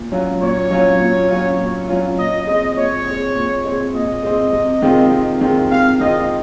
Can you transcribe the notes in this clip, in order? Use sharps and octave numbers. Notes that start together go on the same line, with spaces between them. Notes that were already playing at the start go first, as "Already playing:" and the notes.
Already playing: A#2
F#3 C#4 F4
A#2 C#5
F#3 C#4 F4
A#2
F#3 C#4 F4
A#2
F#3 C#4 F4
A#2 D#5
G#3 C4 D#5
A#2 C#5
C4
G#3
A#2
G#3 C4
A#2 D#5
G#3 C4
C3
D#3 G#3 C4 F4
C3
D#3 G#3 C4 F4
C3 F5
D#3 G#3 C4 F4 D#5